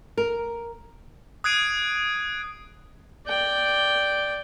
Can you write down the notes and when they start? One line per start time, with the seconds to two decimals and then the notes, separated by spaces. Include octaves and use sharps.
0.17 A#4
1.44 D#6 F#6 G#6 C7 D7 D#7
3.27 D5 G5